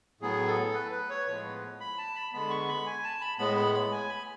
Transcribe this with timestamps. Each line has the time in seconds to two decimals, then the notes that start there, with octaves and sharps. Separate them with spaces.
0.21 A2 F#3 B3 G#4
0.47 A4
0.74 B4
0.92 B4
1.09 C#5
1.27 A2 F3 G#3 B3 B4
1.80 B5
1.98 A5
2.16 B5
2.33 D3 G#3 B3 B5
2.50 C#6
2.68 B5
2.86 G#5
3.04 A5
3.21 B5
3.38 A2 G#3 B3 B5
3.57 B5
3.74 B5
3.92 G#5
4.09 B5